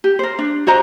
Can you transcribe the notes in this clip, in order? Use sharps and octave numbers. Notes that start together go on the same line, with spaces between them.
G4
A#4 C5
D4
F#4 C5 D#5 A#5